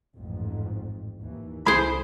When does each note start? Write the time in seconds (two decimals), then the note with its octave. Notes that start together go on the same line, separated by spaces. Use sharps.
0.16 A1 F2 G#2
1.21 D#2 E3
1.67 C2 E4 G#4 A4 C5 B5